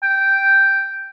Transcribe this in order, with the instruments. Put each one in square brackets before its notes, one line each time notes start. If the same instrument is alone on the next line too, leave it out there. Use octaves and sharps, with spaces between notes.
[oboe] G5